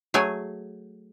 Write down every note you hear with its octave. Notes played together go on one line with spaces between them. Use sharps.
F#3 A3 G#4 G#5